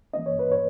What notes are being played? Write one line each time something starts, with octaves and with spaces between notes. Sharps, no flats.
E3 A#3 C#4 D#5
C#5
B4
C#5